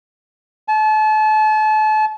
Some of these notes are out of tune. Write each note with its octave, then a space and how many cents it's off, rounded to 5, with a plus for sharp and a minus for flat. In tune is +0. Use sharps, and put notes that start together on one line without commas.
A5 -35